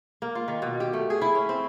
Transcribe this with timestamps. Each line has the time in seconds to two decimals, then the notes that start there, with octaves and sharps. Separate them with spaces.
0.22 A#3
0.35 F4
0.48 D#3
0.62 B2
0.80 G4
0.93 A3
1.10 G#4
1.22 E4
1.35 C#4
1.49 C4